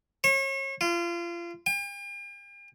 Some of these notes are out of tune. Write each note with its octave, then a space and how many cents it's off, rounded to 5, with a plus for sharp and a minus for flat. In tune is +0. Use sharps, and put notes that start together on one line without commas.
C#5 -35
F4 -30
G5 +45